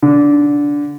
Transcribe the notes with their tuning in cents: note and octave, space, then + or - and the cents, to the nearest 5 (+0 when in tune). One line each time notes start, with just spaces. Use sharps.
D3 -15